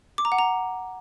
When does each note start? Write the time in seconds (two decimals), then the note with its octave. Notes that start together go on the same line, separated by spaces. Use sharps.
0.18 D6
0.25 A#5
0.32 F#5
0.39 A#5